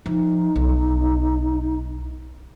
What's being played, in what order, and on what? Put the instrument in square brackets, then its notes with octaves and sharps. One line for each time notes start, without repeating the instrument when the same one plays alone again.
[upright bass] F3 [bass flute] D#4
[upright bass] B1